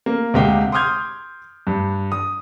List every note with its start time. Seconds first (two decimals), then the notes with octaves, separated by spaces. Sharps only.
0.06 A#3
0.34 D2 C3 G#3 G4 F5 G5
0.72 C6 D6 D#6 F6 G6 G#6
1.67 G2
2.12 D#6